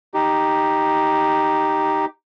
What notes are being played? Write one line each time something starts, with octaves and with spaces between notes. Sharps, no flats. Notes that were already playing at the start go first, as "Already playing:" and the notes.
D#4 G4